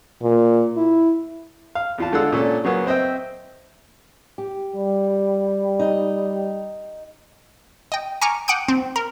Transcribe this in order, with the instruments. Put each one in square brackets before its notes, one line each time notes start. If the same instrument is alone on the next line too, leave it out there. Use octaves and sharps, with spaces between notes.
[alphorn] A#2
E4
[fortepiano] F5
E2 F4 A5
D3 G#3 F4 A4 F#5 E6
A#2 C#4 D4 A4
C#3 F#3 A#3 B3 C#4
C4 C5 D#5 E5 G5
[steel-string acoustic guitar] G4
[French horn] G3
[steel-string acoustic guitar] D#4 D#5
[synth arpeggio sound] D#5 G5
G#5 A#5 C#6 D6 F6
F#5 G5 D6 D#6 G6
C4
A#4